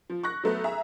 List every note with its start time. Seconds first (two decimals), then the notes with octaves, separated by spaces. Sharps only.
0.10 F3
0.23 C#6 F#6 A#6
0.44 F#3 A3 B3
0.64 G#4 E5 A#5